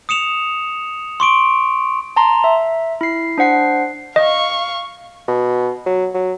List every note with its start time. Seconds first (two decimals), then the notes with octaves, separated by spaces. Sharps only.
0.09 D#6 C#7 E7 F7
1.20 C6 C#6 D7
2.16 A5 A#5 C6
2.44 E5
3.01 E4 C7
3.38 D4 C5 F#5 C7
4.16 D#5 F5 C#6
5.28 B2
5.86 F#3
6.14 F#3